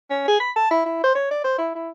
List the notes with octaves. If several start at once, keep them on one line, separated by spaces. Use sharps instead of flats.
C#4
G#4
B5
A5
E4
E4
C5
C#5
D5
C5
E4
E4